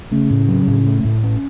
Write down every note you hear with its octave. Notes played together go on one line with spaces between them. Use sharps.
C#3 A3
A2
F#3
A2
A3
A2
C#4